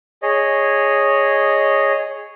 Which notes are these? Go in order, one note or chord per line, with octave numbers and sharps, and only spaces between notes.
G#4 C#5 D#5